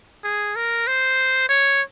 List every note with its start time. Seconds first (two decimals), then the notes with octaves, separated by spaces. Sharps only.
0.24 G#4
0.56 A#4
0.88 C5
1.49 C#5